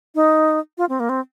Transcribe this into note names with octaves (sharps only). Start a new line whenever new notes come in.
D#4
F4
C4
A#3
C4